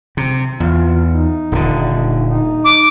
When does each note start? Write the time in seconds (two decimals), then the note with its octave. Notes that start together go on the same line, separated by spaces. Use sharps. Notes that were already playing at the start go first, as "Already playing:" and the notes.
0.17 C3
0.60 E2 F4
1.08 D#4
1.52 D#1 D3
2.27 D#4
2.64 D6